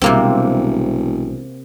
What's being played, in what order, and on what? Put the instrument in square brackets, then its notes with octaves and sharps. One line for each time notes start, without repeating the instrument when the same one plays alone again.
[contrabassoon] E1 [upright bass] B1 G3 [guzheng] C3 A#3 C4